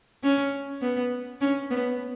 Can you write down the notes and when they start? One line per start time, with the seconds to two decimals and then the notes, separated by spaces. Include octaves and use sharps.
0.23 C#4
0.82 B3
1.41 C#4
1.70 B3